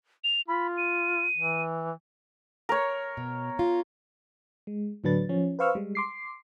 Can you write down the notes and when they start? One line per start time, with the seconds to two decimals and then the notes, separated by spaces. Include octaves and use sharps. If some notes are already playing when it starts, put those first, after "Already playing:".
0.24 F7
0.48 F4 B5
0.77 D#7
1.37 E3
2.69 A#4 C#5
3.17 B2
3.59 F4
4.67 G#3
5.04 A2 D3 F#3 D4 B4 A6
5.29 F3 C#4
5.59 B4 C5 F5 C#6 E6 F6
5.75 G3 G#3
5.95 C6 D6 C7